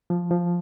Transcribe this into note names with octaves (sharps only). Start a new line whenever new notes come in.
F3
F3